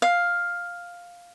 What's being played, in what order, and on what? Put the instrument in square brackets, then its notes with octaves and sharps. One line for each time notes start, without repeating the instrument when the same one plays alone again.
[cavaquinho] F5